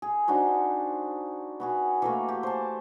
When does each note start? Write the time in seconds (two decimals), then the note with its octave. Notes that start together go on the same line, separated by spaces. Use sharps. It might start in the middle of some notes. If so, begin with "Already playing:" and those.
0.02 G#4
0.28 D4 D#4 F#4 C5
1.60 B3 F#4 G#4
2.02 E3 A3 A#3
2.29 G4
2.43 C5 A5